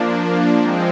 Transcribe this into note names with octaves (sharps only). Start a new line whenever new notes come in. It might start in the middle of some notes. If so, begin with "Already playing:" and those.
Already playing: F3 A#3 D4
F3 G#3 C4